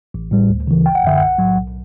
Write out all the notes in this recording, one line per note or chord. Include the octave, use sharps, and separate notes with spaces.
A1
A2 G3
D2
C#3 E3
G1 G5
F#5
F#2 D3 E5
B1 F#5
A2 F#3
B1